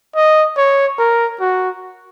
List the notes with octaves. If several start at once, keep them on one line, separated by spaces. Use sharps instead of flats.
D#5
C#5
A#4
F#4